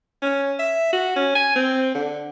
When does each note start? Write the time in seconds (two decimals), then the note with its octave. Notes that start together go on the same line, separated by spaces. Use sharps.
0.22 C#4
0.59 E5
0.93 F#4
1.16 C#4
1.35 G#5
1.56 C4
1.95 D3